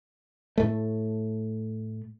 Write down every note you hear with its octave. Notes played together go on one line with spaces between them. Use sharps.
A2 A3